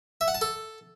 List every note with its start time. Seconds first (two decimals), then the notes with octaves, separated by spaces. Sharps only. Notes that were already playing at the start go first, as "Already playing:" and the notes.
0.21 E5
0.28 F#5
0.35 A5
0.41 A4